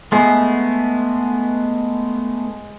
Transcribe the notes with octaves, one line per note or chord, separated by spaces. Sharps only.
G#3 A3 B3